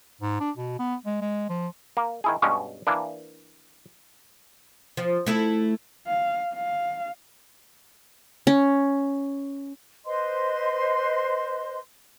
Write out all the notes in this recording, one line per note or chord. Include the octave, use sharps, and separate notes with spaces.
G#2
D4
B2
B3
G#3
G#3
F3
A#3
D#3 E4 G#4
G2 B2 G#3 C#4
E3 A#3 D4
F3
A3 E4 A4
F5
F5
C#4
B4 C5 D#5 C6